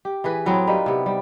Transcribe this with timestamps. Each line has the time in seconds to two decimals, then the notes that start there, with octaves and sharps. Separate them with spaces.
0.05 G4
0.24 E3 G#4 B4
0.46 A2 F#3 B3 C4
0.67 G3 A#3 D#4 B4
0.86 C3 B3
1.06 G3